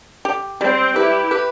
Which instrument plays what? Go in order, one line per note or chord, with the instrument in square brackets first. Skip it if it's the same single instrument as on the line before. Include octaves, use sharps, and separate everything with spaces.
[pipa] G4
[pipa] G3 [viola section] C4
[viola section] E4 G4 [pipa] B4
[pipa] B4